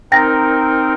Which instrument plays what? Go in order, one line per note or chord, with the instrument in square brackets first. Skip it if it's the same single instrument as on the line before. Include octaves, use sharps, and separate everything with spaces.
[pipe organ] C4 D#4 A#4 [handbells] G5 A6 A#6